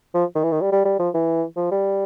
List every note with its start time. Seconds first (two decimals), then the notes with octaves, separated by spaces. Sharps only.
0.14 F3
0.35 D#3
0.43 E3
0.52 D#3
0.61 G3
0.72 G3
0.85 G3
0.99 F3
1.14 E3
1.57 F3
1.71 G3